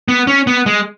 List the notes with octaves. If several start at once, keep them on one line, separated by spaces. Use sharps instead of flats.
B3
C#4
B3
G#3